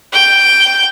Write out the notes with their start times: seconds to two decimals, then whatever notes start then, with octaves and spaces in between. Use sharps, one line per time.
0.13 G5